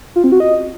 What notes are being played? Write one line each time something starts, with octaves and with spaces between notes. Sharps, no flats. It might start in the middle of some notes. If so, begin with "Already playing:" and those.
F4
C4
F#4
D#5